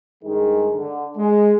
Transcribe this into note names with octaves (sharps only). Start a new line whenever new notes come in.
G2 D#3 G#3 D#4 G#4
D3
G#3